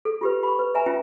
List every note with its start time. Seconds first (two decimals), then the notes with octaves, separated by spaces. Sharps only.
0.05 A4
0.21 F4 G4 B4
0.43 B5 C#6
0.59 B4
0.74 B4 E5 G#5 A#5
0.86 C#4 F4 E5 G5